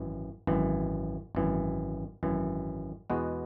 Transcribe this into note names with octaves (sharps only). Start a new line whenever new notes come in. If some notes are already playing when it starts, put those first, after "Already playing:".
Already playing: G#1 F#2 E3
G#1 F#2 E3
G#1 F#2 E3
G#1 F#2 E3
E2 B2 G#3 B3 F#4